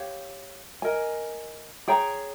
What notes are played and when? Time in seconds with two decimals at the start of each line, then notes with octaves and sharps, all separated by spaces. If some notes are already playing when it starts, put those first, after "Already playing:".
Already playing: G4 C#5 F5
0.82 A#4 D#5 G#5
1.88 G#4 C#5 G5 A#5